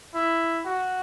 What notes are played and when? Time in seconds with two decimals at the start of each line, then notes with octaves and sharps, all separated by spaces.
0.15 E4
0.65 F#4